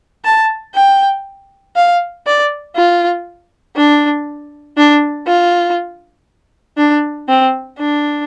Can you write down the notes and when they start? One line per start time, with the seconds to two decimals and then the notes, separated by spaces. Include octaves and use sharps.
0.25 A5
0.75 G5
1.76 F5
2.26 D5
2.76 F4
3.77 D4
4.77 D4
5.27 F4
6.78 D4
7.28 C4
7.78 D4